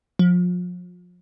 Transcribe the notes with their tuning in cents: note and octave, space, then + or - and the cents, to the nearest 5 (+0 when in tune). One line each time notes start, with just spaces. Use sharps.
F3 +35